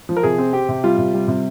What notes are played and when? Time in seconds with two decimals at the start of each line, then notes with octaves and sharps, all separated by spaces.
0.09 F3
0.17 A#4
0.23 C3 G#4
0.38 C4
0.53 C4 G4
0.69 C3
0.84 G3 F4
0.98 C3
1.14 G3
1.28 C3